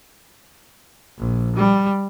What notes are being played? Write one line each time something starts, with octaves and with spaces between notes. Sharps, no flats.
A#1
G3